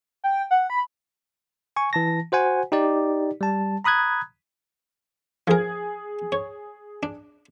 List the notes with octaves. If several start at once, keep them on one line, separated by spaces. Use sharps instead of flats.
G5
F#5
B5
G#5 C#6
E3 A5 A#6
F#4 C5 F#5 G#5
D#4 G4 D5
G3 A5
A#5 B5 D#6 F#6 G#6
F3 G#4 A#4 G#6
C#5
D4